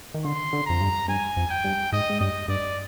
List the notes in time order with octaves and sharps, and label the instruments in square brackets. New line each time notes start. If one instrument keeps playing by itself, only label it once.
[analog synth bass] D#3
[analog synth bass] D3 [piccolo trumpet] C6
[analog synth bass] D3
[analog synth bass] F2 [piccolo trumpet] A#5
[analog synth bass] G2
[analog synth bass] G2 [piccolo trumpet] G#5
[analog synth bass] F2
[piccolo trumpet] G5
[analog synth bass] G2
[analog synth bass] G#2 [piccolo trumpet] D#5
[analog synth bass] G#2
[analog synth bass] G2 [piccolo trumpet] D#5
[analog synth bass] G2 [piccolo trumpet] D5